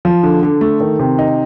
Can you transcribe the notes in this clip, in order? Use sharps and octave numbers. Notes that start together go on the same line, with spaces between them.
F3
D3
D3
A3
D#3
C3
D#4